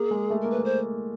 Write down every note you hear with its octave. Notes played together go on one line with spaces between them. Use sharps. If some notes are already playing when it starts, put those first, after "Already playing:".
Already playing: A#3 G#4
G#3
A3
A#3 A#4
B4
A3
C5